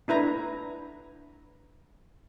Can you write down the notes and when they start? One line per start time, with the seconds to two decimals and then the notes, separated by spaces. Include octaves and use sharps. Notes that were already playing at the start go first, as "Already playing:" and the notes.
0.08 D4 E4 B4 A#5